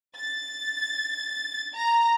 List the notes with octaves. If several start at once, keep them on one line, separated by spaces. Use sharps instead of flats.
A6
A#5